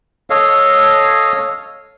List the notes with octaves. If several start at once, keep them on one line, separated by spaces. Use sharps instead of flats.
A4 C#5 D#5 F5